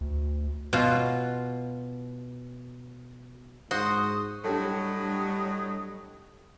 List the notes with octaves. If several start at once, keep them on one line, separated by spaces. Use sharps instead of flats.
D2
B2 F4
G#2 F#4 C5 D#6
A2 F#3 G3 D4 G4 A4 D#5